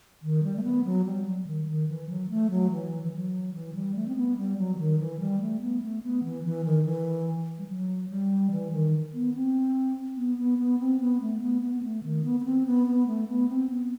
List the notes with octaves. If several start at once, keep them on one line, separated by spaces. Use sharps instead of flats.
D#3
G3
A3
B3
F#3
G3
F#3
D#3
D#3
E3
F#3
A3
F#3
E3
E3
F#3
E3
G3
A3
C4
B3
G3
F#3
E3
D#3
E3
G3
A3
B3
A3
B3
E3
E3
D#3
E3
G3
F#3
G3
E3
D#3
B3
C4
B3
B3
B3
C4
B3
A3
B3
B3
B3
A3
D#3
B3
B3
C4
B3
B3
A3
B3
C4
B3